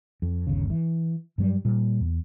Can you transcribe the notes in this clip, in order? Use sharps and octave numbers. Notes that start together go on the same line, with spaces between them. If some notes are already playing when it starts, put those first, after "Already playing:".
F2
G1 D#2 C#3
E3
G2 F#3 G3
A#2 G3
E2